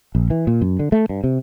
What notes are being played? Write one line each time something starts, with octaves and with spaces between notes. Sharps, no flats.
A#1
E3
A#2
F#2
D3
A3
G2
C3